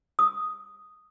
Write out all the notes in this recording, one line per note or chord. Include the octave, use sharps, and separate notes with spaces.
D#6